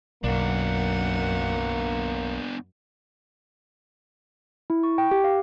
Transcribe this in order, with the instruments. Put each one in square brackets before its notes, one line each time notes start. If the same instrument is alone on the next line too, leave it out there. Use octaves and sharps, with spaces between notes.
[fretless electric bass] B1 [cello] F#2 F#5 [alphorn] A#3 [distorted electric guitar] B3 D4
[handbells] E4
C#6
G5
G4
F5